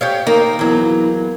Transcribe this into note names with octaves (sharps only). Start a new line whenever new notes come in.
G4 C#5 F5
A#3 D#4
E2 F#3 E4